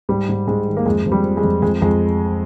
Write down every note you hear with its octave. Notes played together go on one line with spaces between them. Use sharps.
G#2 G3
G#2
G#2 G#3
D#3
A#3
F2 G#3
F2
G3
F3
G#3
F2
F2 G#3
F2 G#3